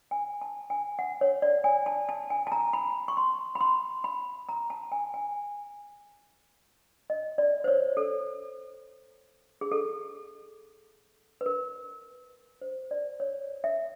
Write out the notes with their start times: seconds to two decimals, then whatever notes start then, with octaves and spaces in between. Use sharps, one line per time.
0.11 G#5
0.41 A5
0.70 G#5
0.99 F#5
1.21 C#5
1.42 D5
1.64 G#5
1.86 A5
2.09 A5
2.30 G#5
2.47 A5
2.52 A#5
2.73 B5
3.08 C#6
3.17 C6
3.55 B5
3.61 C6
4.04 B5
4.49 A#5
4.70 A5
4.92 G#5
5.14 G#5
7.10 D#5
7.38 D5
7.64 C5
7.68 C#5
7.97 A4
9.61 G#4
9.72 A4
11.41 B4
11.46 A#4
12.62 C5
12.91 D5
13.20 C#5
13.64 E5